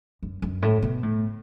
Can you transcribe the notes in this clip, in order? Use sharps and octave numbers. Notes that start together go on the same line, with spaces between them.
F#2
F#2
A2
B2
A2